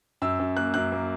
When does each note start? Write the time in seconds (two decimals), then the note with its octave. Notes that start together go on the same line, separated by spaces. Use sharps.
0.22 F#2 E6
0.39 F#2
0.56 A#3 F#6
0.74 F#2 F#6
0.92 A#3